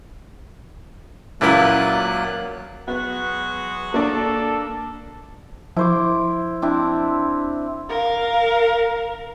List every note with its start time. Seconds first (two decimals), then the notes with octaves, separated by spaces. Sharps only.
1.41 C#2 A#2 F#3 A#3 E4 F#6
2.88 F#3 G#3 B3 F#4
3.94 A#3 D4 A4
5.77 F3 E4 C5 D6
6.62 C4 D4 E4
7.89 A#4 F5